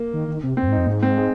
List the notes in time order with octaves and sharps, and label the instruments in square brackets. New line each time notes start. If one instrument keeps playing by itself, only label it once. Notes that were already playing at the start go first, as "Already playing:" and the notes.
Already playing: [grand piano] A#3
[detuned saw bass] D#3
D#3
C3
[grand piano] C4
[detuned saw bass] F2
G#2
[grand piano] D#4
[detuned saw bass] F2
[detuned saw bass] G#2 [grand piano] C4
[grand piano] C4
G#3